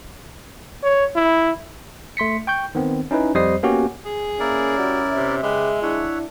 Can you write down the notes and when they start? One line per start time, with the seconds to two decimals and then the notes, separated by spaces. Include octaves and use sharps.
0.83 C#5
1.16 E4
2.17 A3 C6 B6 C#7
2.47 G5 C#6 G6
2.75 D#3 B3 C4
3.11 C#4 D#4 E4 B4
3.35 F2 G3 C5 D#5 D#6 C7
3.63 A#3 B3 C#4 F#4 G4
4.05 G#4
4.40 A#3 C#4 E4 A#4 D5
4.78 G3 F#4
5.12 C3 E5
5.43 C#3 G#3 G4 B4
5.82 D4 E4 C#5 E5 F#5